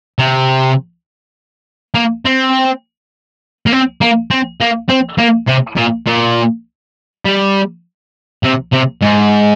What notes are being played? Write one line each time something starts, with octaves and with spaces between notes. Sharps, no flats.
C3
A#3
C4
A#3
C4
A#3
C4
A#3
C4
A#3
C3
A#2
A#2
G3
C3
C3
G#2